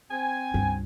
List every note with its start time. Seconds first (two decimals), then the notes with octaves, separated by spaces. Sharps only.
0.11 C4 G#5
0.54 C#2 G2